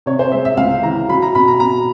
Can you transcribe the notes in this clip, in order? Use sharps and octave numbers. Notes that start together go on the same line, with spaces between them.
C3 C#5
C5
G#3 E5
E5
C#2 F5
E3 A#5
F#3 B5
A#5
B2 B5
A#5
B2 A#5